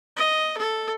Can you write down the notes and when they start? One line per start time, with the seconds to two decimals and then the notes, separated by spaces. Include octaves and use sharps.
0.17 D#5
0.58 A4